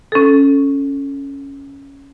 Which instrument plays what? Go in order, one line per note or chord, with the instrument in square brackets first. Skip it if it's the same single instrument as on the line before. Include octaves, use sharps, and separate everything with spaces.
[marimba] C#4 A4